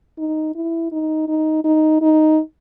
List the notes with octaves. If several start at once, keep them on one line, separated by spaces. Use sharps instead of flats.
D#4
E4
D#4
D#4
D#4
D#4